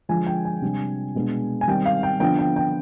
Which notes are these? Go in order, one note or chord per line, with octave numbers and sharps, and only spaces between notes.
D3 F3 G#3 G#5
G5
G#5
C3 G3 D4
B2 G#3 B3 D4
G#5
D#3 G3 C4 G5
F5
G5
D3 F3 B3 D4 G5
G5
G5